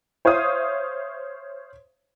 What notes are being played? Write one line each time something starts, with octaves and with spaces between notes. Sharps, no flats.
C5 C#5 E5 F5 D#6